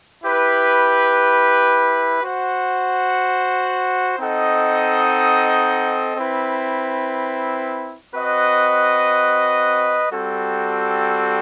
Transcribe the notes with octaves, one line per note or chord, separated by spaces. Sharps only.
E4 G4 B4
F#4 C5 F#5
C4 D#4 A4 D#5 F#5
C4 E4 B4
C4 F#4 B4 D#5
G3 C4 F#4 A4